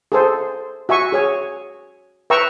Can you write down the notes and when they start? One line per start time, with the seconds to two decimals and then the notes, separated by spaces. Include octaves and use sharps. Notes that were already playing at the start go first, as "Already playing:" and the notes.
0.12 G#4 A4 C5
0.89 F#4 E5 G#5 C#6
1.12 G#4 C#5 G#5
2.30 B4 E5 G5 A#5 C#6 E6